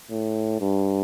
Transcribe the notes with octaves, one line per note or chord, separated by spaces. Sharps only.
A2
G2